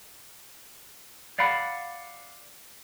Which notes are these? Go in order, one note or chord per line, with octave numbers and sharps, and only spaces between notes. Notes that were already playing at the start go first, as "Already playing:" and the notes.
D5 F5 F#5 B5